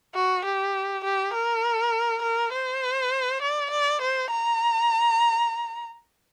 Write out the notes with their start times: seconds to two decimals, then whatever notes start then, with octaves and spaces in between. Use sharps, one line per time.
0.15 F#4
0.45 G4
1.04 G4
1.34 A#4
2.23 A#4
2.52 C5
3.42 D5
3.71 D5
4.01 C5
4.31 A#5